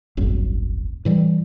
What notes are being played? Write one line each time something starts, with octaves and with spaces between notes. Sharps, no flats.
D#1 G#1 F#2
A2 E3 G3